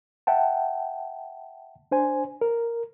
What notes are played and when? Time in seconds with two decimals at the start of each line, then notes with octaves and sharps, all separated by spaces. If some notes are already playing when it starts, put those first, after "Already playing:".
0.27 E5 F#5 G5 A5
1.91 D4 C5 G#5
2.41 A#4